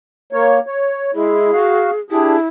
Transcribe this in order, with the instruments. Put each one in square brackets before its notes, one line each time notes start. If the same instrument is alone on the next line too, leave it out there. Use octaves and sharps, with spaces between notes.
[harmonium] A#3 C#5
C#5
[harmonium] G#3 E4 [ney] G#4
[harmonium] F#4 F5
[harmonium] D4 G4 G#4 [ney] E4